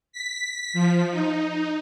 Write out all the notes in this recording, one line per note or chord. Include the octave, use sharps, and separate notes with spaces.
B6
F3
D#4